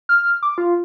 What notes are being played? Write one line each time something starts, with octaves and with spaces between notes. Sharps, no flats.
F6
D6
F4